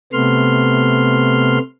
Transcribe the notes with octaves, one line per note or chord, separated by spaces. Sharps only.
C3 A3 B3 C6 F6